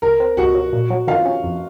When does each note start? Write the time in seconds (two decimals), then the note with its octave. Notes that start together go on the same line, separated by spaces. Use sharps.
0.02 C#2 A#4
0.20 C4
0.37 C#2 F#4 F#5
0.55 F#3
0.73 A#2
0.90 F#3
1.07 D#3 F4 F5
1.25 C#4
1.44 F2